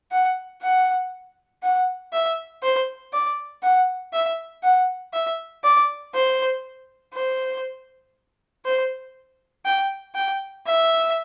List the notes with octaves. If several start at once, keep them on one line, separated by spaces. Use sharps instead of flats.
F#5
F#5
F#5
E5
C5
D5
F#5
E5
F#5
E5
D5
C5
C5
C5
G5
G5
E5